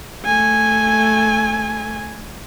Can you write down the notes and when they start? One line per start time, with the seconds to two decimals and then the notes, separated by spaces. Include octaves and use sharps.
0.25 A3 G#5